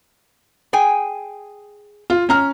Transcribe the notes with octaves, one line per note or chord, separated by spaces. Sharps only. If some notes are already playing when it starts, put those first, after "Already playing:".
G#4 G5 G#5
F4
C#4 A#5 F6